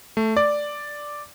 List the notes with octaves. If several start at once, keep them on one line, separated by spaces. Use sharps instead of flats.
A3
D5